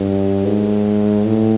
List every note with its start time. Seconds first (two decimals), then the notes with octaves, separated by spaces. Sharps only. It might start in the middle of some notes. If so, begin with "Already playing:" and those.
Already playing: G2
0.45 G#2
1.26 A2